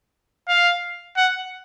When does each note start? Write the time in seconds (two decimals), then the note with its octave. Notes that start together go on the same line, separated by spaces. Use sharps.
0.49 F5
1.17 F#5